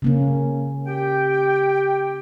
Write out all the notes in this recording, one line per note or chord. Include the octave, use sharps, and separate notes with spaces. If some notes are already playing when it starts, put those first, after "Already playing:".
C#3 A#3 C#4
G4 G5